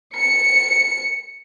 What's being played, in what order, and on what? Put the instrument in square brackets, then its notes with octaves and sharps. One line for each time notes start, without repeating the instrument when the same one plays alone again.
[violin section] C#7